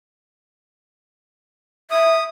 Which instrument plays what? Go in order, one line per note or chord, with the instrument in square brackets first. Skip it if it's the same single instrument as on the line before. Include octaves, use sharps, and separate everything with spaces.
[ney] E5 [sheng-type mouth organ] D#6